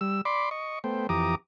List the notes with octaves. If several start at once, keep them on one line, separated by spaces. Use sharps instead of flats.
G3 E6
D5 B5 C6 D6
D#5 C#6
A3 B3 C5 G5
F2 E3 G4 A#5 D6 D#6